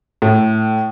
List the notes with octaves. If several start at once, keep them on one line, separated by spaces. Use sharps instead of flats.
A2